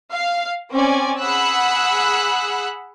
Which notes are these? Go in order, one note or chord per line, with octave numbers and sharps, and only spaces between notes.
F5
C4 C#4 D5 G#5
G#4 F#5 B5 E6 F#6